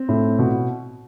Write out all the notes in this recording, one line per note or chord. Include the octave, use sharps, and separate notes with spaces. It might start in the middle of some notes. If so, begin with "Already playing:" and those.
Already playing: C4
A2
B2